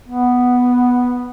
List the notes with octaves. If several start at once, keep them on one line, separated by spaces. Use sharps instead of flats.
B3